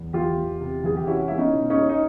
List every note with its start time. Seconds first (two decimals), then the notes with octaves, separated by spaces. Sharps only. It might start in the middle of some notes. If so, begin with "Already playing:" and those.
Already playing: E2
0.13 E3 F4 G4
0.37 E2
0.61 C3
0.84 E3 G#4
0.97 G4
1.07 C#4 E4 F#4
1.28 G#3 E4
1.38 C#4 D#4
1.55 B2
1.70 C#4 D#4
1.77 G#3
1.89 D#4